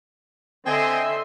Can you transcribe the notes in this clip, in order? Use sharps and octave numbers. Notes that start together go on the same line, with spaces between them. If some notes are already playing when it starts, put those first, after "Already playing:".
D3 C4 D#5 E5 G#5 C6